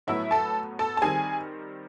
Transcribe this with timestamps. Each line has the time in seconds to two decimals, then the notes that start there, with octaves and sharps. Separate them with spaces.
0.07 A2 F#3 B3 E4 E5
0.31 A4 A5
0.79 A4 A5
0.97 A5
1.02 D#3 G3 C4 G#4 G#5